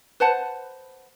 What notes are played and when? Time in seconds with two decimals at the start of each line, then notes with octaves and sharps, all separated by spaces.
0.20 B4 C5 F#5 A5